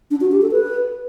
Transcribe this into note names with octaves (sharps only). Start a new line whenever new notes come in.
D4
F#4
G4
A4
B4